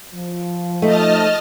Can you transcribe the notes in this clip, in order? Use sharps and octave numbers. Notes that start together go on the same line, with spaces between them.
F3
A3 D#4 D#5 A5 F6